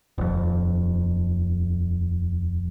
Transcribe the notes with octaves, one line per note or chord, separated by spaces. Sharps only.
D#1 F2